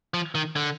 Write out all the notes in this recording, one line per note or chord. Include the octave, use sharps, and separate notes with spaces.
F3
D#3
D3